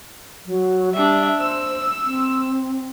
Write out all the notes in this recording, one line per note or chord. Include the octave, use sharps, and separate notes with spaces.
F#3
G3 D4 E5
C5 E6
C4